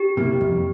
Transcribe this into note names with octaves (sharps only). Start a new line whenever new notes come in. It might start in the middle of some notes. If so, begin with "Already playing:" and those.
Already playing: G4
C3 G3 A#3 E4
F2